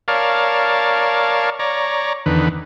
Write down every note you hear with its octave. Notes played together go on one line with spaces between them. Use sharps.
A#4 C#5 D5 F5 A5
C#5 D5 A#5
E2 D3 D#3 B4